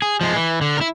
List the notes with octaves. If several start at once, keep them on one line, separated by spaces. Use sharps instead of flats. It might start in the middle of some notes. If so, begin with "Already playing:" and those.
G#4
F3 G#3
E3
D3
E4 A#4